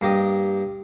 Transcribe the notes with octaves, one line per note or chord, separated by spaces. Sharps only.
G2 A#3 G4 D#5 D#6